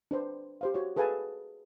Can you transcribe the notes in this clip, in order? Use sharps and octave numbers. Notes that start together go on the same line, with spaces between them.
D4 B4 C5
G4 C5 F5
F#4 C#5
G#4 A4 B4 F5 G#5 A5